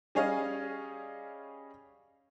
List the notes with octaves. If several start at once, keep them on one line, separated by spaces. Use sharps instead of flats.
G3 C#4 G#4 C#5 D#5 F5